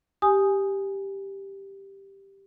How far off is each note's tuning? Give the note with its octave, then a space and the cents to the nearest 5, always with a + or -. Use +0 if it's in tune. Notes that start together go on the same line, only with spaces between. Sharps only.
G4 +0 G#5 +0 D#6 +0